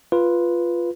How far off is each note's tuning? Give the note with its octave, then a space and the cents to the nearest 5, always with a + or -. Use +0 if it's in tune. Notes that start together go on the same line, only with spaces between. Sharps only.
F4 -5 B4 -5